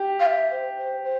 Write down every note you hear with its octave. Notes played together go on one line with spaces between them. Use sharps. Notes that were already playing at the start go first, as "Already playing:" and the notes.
Already playing: G4
F5
E5
C5
C5
C5